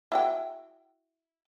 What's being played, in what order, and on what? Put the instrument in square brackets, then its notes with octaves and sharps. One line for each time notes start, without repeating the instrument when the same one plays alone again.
[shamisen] E4 F#4 G5